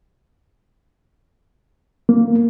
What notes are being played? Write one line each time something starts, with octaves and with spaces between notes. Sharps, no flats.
A#3